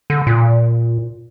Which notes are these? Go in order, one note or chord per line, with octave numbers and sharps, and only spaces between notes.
D3
A#2